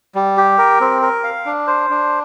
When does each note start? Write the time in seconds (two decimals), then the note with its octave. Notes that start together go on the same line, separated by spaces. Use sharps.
0.15 G3
0.37 G4
0.58 A#4
0.81 C4
1.02 A#4
1.24 F5
1.46 D4
1.67 C5
1.90 D4